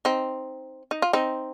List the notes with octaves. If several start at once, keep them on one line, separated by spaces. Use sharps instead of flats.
C4 D#4
D#4
F4
C4 D#4